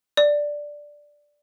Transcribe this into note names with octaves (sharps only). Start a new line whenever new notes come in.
D5